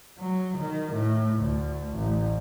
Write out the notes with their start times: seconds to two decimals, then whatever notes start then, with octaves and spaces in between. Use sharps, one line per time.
0.18 F#3
0.57 D#3
0.93 A2
1.39 D2
1.94 A1